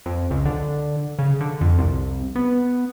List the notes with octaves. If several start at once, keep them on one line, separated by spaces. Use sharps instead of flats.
F2
C#2
D3
C#3
D3
F2
C2
B3